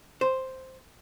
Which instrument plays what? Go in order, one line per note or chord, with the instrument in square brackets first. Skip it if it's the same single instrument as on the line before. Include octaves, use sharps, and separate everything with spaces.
[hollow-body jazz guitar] C5